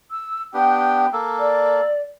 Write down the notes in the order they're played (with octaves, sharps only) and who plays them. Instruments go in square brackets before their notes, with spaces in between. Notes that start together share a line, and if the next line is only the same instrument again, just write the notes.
[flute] E6
[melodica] B3 D4 G4 [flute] G5
[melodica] A#3 A4
[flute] D5